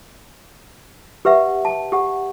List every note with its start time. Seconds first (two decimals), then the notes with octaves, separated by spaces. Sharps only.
1.25 G4 B4 E5 F#5
1.65 A5
1.92 G4 F#5